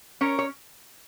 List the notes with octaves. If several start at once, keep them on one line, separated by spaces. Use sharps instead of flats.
C#4 A#4 C#5
C#5